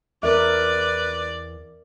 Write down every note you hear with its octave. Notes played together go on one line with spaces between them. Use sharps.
E2 C4 A#4 B4 D5 E5